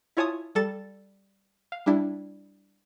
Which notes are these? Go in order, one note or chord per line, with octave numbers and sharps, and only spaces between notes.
E4 F4 C#5 G#5 A5 D#6
G3 A4 A6
F5
G3 D4 E4